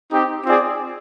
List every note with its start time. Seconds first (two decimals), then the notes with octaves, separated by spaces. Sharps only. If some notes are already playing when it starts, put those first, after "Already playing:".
0.10 C4 D#4 G4
0.44 C4 F4 G#4 D5